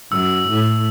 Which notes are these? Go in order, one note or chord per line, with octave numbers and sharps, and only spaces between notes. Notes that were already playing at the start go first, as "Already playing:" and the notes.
F#2 E6
A2